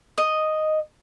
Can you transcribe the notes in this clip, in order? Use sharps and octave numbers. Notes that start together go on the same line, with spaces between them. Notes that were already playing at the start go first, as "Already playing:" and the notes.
D#5